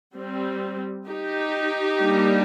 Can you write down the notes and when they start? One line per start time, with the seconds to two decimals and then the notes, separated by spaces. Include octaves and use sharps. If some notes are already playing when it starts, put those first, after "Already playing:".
0.15 G3 C4
1.07 D#4 G4
1.99 G3 A#3 D4